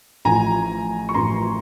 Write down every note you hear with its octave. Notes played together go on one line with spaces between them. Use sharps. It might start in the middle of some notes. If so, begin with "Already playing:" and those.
A1 A2 F3 G#5 A#5
C#6
A1 A2 F3 A#5 C6